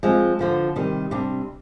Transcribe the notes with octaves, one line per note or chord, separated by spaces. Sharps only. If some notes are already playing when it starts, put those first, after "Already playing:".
F3 G#3 C4
D3 F3 B3
C3 D#3 G3
C3 G3 D4